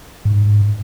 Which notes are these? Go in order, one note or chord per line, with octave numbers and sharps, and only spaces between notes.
G#2